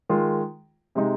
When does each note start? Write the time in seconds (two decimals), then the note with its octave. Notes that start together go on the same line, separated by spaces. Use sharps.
0.09 D#3 G#3 F4
0.95 C3 G#3 D#4